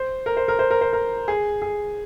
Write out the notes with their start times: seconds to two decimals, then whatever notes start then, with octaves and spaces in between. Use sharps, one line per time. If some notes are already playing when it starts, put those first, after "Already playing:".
Already playing: C5
0.26 A#4
0.37 C5
0.48 A#4
0.59 C5
0.71 A#4
0.81 C5
0.93 A#4
1.28 G#4
1.62 G#4